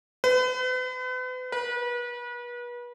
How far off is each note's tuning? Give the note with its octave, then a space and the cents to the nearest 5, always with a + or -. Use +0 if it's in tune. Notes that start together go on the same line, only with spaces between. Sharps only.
B4 +40
B4 -35